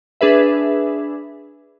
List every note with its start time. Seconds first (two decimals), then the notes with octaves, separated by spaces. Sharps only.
0.21 D4 G#4 B4 E5